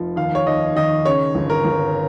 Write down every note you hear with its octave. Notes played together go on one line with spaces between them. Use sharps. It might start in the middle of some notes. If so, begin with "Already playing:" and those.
Already playing: F1 F3
D#2 F5
C#5
D#2 D#5
D#3 D#5
C#3 C#5
G1
A#4
G1